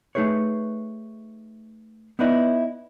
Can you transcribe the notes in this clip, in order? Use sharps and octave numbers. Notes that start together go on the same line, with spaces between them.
A3 D#4 G#4 B4 C#5
B3 D#4 E4 B4 D5 D#5